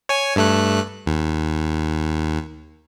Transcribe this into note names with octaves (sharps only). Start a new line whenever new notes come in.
C#5 G#5
G2 A3 F#6
D#2